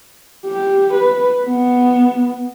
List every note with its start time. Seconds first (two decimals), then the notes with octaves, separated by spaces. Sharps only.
0.46 G4
0.93 B4
1.45 B3